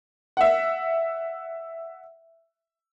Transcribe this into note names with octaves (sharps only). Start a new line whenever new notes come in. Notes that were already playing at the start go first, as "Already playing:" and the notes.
E5 F#5